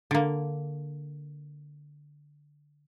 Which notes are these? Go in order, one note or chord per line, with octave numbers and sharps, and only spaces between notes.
D3 A#3